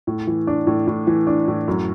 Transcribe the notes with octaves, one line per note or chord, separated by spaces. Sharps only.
A2
E3
D4
A2
A2
E3
D4
A2
F#2